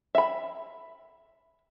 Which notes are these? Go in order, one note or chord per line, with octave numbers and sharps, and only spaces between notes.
E5 B5